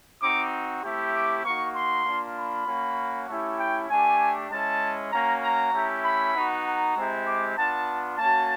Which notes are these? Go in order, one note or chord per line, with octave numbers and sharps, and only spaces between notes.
C4 D#4 F#4 D6
A3 C4 E4 G4
D6
A#3 D#4 F#4 C#6
C6
A#3 D4 F4
B5
A#3 C#4 F#4
A3 C#4 E4 G4
G5
A3 D4 G4 G#5
G#3 C#4 E4 A5
A#3 C#4 F#4 A#5
A#5
A3 C#4 E4 G4
B5
B3 D#4 F#4
A#5
G#3 C4 E4 G4
D6
B3 D4 F4 A5
A#3 C#4 F#4 A5